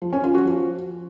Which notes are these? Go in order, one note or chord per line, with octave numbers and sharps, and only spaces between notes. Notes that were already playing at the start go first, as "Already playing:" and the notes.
F3
C#4
F4
F#4
F3